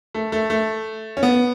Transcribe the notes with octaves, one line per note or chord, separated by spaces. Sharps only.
A3
A3
A3
C#4
B3